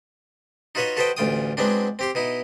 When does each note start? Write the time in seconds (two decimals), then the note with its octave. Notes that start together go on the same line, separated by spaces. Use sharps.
0.75 D#4 F4 F#4 B4 C#5 D#5
0.97 F#4 A4 B4 C5 D#5 G5
1.17 A1 D2 F4 G5 D#6
1.57 F#3 G#3 B3 C4 D4
1.99 C4 G4 C6
2.15 B2 D#4 E4